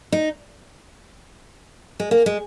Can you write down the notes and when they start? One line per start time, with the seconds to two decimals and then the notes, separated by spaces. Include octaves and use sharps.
0.12 D#4
2.00 G#3
2.11 A#3
2.26 G#3